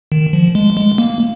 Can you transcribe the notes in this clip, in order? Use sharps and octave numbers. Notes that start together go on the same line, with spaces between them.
D#3
F3
G#3
G#3
A#3